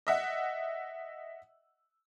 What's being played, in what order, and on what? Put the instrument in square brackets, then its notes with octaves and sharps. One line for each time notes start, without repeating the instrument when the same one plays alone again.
[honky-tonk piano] D#5 E5 F#5